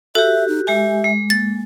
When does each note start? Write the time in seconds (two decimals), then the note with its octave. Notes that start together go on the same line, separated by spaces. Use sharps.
0.15 F#4 G4 A4 E5
0.48 D#4
0.67 G#3 G4 E5 G#5
1.04 G#3
1.30 A#3 A6